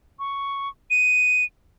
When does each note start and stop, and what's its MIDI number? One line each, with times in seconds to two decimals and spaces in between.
0.19 0.69 85
0.91 1.44 99